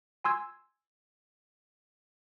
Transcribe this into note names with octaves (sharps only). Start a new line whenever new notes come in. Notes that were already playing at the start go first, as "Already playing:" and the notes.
G#5 C6 E6 G#6